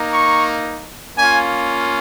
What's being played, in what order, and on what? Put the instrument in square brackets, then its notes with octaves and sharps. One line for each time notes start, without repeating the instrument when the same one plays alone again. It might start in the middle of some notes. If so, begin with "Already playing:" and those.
Already playing: [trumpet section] A#3 D#4
C#6
A#3 C#4 F4 G#5